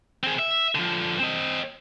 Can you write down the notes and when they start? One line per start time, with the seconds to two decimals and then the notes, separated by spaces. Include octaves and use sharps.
0.24 C4 G#4
0.39 E5
0.75 D3 F3
1.20 C4 D#5